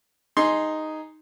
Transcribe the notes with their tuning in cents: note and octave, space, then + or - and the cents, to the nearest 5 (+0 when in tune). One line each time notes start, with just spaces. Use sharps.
D#4 +0 G#4 +0 C6 +0